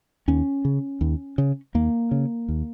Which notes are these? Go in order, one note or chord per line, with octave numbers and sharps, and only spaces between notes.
D#2 C#4
C#3
D#2
C#3
D#2 A#3
C#3
D#2